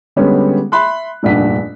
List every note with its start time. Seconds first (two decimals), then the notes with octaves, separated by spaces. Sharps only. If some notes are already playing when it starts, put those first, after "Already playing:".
0.16 D3 G3 G#3 B3 C#4
0.72 E5 B5 C6 F#6
1.23 F1 A#1 G2 F#5 B6